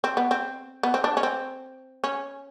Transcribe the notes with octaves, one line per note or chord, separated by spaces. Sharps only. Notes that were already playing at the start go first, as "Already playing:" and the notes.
C4
B3
C4
B3
C4
D4
C#4
C4
C#4